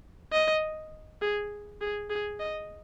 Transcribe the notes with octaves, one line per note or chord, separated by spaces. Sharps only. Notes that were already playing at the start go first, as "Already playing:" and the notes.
D#5
G#4
G#4
G#4
D#5